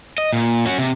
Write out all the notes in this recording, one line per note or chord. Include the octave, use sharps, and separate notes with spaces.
D#5
A#2
C#4 F#4
C3